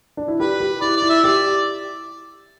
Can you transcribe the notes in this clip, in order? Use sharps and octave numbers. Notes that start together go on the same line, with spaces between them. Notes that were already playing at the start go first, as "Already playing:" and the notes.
D4
E4
G4 B4
G4
E4 D5
D5
E4
E5
G4 D5